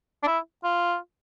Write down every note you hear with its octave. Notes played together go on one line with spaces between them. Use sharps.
D4
E4
F4